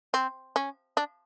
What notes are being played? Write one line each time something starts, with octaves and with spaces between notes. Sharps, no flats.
C4
C#4
D4